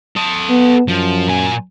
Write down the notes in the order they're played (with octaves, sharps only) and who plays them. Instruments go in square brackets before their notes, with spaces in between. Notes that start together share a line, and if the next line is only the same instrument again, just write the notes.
[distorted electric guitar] A4 D#5
[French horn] B3
[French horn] F#2 [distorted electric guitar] F3
[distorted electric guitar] A#2 G#5